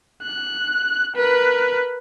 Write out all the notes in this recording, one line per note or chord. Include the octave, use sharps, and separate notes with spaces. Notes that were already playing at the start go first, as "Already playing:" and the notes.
F#6
A#4 B4